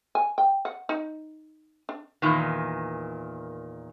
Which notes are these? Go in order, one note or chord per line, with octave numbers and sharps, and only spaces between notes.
G#5
G5
F#5
D#4
D4
E2 A#2 D#3